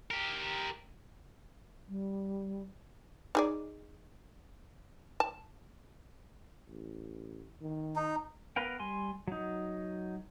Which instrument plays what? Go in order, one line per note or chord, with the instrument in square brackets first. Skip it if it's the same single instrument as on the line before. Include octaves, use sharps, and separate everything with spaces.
[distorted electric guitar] G4 A#4
[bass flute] G3
[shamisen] D#4 G#4 D5
A5
[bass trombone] A1
D#3
[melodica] D#4
[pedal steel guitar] B3 A#4 B4 F5 G5
G3 G#5 C6
F#3 D#4